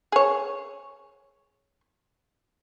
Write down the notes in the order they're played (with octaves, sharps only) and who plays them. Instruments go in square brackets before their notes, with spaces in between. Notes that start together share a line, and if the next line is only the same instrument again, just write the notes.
[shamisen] G#4 C#5